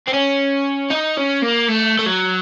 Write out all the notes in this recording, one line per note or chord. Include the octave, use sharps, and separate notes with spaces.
C4
C#4
D#4
C#4
A#3
A3
A3
F#3